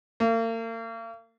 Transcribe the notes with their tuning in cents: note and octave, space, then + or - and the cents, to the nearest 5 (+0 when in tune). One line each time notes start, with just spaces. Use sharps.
A#3 -40